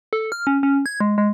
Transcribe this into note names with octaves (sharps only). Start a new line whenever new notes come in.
A4
F6
C#4
C#4
G#6
G#3
G#3